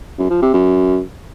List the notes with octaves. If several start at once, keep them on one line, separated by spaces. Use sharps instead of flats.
F#2
F3
C3
F#2